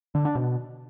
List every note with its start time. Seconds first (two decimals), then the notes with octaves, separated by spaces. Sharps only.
0.15 D3
0.25 D4
0.35 B2